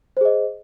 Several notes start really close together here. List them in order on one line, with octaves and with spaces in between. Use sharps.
C5 G#4 D#5